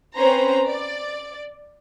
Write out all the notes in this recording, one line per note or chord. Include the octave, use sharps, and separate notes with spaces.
C4 C#4 B4 C5 A#5
D5